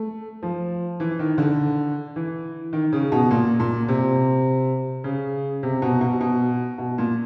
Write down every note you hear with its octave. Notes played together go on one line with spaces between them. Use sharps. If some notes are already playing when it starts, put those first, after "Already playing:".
Already playing: A3
F3
E3
D#3
D3
E3
D#3
C#3
B2
A#2
A#2
C3
C#3
C3
B2
B2
B2
B2
A#2